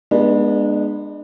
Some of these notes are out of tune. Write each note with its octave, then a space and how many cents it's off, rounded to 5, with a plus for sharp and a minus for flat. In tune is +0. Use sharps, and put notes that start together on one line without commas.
G#3 +0 B3 -20 D4 +35